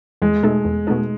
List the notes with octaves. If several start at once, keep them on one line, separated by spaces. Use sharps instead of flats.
E2 G#3
B2 A3 D#4 A4
E2
B2 A3 D#4 A4